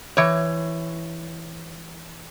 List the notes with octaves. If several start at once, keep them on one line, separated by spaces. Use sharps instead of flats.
E3 C#5